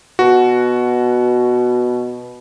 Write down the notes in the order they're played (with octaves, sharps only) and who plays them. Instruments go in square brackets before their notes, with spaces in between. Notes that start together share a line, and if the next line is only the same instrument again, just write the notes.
[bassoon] B2 [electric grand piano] F#4